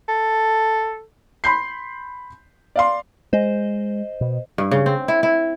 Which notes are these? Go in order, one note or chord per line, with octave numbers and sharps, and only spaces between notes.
A4
B5 C6 G6 C7
D5 F5 C6
G#3 C5 D#5
B2
G2
C#3
C4
E4
E4